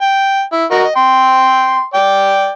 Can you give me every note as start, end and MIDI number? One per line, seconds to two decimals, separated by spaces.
0.01 0.42 79
0.52 0.65 64
0.71 0.84 66
0.71 0.84 70
0.71 0.84 75
0.84 0.92 75
0.96 1.84 79
0.96 1.84 84
1.94 2.50 74
1.94 2.50 79